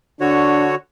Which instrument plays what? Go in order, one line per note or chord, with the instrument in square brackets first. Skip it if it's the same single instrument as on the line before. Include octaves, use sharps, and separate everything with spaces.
[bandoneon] D3 F#4 C#5 [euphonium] D4